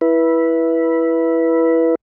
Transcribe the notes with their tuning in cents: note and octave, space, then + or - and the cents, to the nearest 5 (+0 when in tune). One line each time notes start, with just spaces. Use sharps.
E4 +0 B4 -15